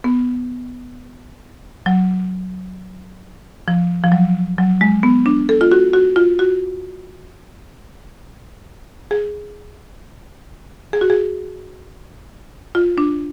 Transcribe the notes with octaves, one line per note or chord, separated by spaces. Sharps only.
B3
F#3
F3
F3
F#3
F#3
G#3
B3
D4
A4
F4
F#4
F#4
F4
F#4
G#4
G#4
F#4
G#4
F4
D4